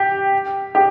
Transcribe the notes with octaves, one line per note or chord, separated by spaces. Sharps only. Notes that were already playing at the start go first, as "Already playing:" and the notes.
Already playing: G4
G4